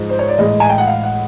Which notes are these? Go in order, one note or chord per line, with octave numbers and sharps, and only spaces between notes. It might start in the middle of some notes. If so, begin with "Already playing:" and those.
Already playing: G#2 F3 G#3
C5
C#5
D5
A2 E3 G#3 D#5
G#5
G5
F#5
F5
F#5